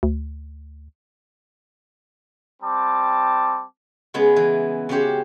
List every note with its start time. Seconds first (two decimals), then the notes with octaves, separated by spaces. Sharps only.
0.03 D2
2.62 G3 C4 A5 D6
4.14 C#3 G#3 B3 C#4
4.36 E3
4.89 C#3 C#4 F#4 G4 C5 C#5